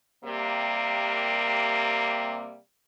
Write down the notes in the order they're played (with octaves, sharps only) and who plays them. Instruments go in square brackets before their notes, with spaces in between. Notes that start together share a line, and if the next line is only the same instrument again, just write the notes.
[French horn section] C3 G3 A#3